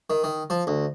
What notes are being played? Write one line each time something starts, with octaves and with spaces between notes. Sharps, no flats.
D#3
D#3
F3
D2